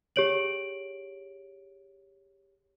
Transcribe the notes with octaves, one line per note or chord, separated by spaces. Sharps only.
G4 G#4 C#5 D7 F#7